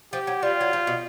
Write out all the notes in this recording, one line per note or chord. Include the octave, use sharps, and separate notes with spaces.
F3 G4
F#3
G3 F4
F#3
F3
B2